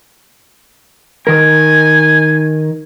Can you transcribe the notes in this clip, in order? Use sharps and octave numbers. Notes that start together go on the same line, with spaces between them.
D#3 A#4 G#5